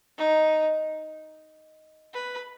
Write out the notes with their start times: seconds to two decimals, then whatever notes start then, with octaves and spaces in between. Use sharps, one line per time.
0.18 D#4
2.14 B4